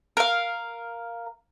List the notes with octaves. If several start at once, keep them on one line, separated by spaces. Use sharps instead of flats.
A#4 F5